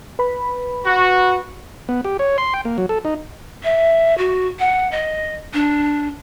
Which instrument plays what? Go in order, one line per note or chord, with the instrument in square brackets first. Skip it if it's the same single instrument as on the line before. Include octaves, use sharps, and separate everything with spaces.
[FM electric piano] B4 B5
[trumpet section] F#4
[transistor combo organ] B3
G4
C#5
C6
G5
A#3
F#3
A4
D#4
[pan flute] E5
F#4
F#5
D#5
D4